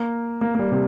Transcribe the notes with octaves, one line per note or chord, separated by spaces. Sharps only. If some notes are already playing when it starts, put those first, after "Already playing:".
Already playing: A#3
A#3
A#3
G3
C3